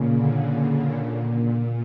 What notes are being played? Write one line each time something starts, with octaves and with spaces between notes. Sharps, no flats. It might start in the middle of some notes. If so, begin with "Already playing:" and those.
Already playing: A#2 C#3
D3
A#2
A#2